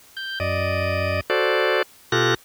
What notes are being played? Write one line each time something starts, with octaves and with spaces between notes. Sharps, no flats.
G6
F#2 D5 D#5
F#4 A4 C5 D5
B2 F4 G4 A4 F#6 A#6